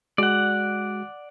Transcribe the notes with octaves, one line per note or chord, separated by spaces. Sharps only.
G#3 F#4 D5 F#5